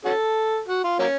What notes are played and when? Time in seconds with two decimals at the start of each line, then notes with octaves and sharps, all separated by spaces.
0.05 C#4 F#4 A4
0.68 F#4
0.84 F4
0.99 F#3 A#3 C#4